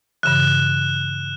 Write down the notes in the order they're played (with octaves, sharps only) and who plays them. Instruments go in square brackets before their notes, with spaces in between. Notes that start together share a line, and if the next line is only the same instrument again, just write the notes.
[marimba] G2 C#3 E3 [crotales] F#6 E7